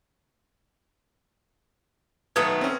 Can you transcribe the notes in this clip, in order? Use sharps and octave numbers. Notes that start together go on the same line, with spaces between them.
B1 D#3 A3 B3 D#6 G#6
C4 C#4